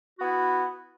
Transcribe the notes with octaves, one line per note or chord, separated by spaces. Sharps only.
B3 E4 F#4